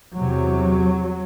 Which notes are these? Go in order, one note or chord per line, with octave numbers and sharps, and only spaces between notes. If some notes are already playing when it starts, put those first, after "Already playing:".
E2 C3 F#3